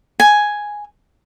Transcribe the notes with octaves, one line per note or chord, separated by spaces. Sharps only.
G#5